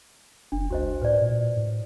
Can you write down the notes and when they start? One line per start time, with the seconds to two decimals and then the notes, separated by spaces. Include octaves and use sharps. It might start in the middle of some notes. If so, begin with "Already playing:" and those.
0.52 F#1 D4
0.70 C#2 F#4 C5 D#5
1.02 A2 B4 D5
1.21 A#2
1.56 A2